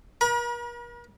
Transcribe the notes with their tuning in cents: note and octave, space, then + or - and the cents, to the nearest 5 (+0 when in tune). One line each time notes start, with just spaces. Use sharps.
A#4 +45 B5 -45